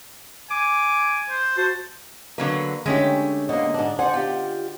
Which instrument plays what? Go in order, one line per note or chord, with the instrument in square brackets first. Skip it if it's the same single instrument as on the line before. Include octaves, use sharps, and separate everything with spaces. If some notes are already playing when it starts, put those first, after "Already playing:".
[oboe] G#5 [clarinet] D6
[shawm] C5
[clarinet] F#4 [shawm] C5 [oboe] A5
[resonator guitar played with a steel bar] D3 F#3 B4 [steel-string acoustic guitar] A#3
[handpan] D3 C#4 D4 [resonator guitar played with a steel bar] G#3 A3 G4
[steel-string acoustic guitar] D3 A#3 [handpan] D#5
[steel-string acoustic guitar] G#2 D4
[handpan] C5 D5 [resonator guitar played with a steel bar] F#5 [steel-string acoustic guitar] G#5
[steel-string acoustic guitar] F4 G4